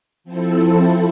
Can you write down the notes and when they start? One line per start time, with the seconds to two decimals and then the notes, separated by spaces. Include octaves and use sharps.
0.24 F3 C4 E4 A4